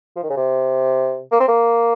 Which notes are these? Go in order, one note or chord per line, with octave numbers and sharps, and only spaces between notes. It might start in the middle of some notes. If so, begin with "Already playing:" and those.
F3
D#3
C#3
C3
A#3
C4
A#3